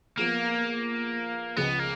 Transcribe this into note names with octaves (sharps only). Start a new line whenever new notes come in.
F3 A#3 B3 F4 G#4
C#2 C#3 F3 G#3 B3
A#3